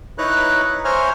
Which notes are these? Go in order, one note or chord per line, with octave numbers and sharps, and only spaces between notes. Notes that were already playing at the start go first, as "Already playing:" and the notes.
D#4 E4 B4 C#5 A#5 F#6
C5 C#5 E5 G#5 A#5 F6